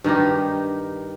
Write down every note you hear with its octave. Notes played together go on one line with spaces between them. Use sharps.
G2 D#3 D#4 G4